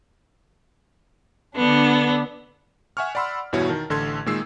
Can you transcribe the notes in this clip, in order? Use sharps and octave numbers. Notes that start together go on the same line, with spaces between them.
D3 B3 D4
E5 F#5 G#5 C#6 F6
D5 F#5 B5 C6 E6
E2 G2 B2 E4 F#4 C#5
D#3 A#4 A5
A1 D3 A4 C6 G#6
A#2 D#3 G#3 E6 C7